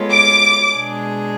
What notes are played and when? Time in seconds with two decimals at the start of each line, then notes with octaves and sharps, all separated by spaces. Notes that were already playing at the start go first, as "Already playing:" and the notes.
Already playing: G#3 B3 F4 A4 C#5
0.11 D6
0.76 B2 G#3 D4 G#4